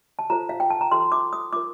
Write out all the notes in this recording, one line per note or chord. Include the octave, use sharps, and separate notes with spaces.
A5
F4 A4 C5 A#5
F5
G5
A5
A#5
F4 A4 C5 C6
D6
D#6
F4 A#4 D6